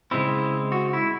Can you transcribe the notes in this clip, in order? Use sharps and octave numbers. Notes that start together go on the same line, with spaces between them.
C#3 G#3 C4 E4
F#4
E4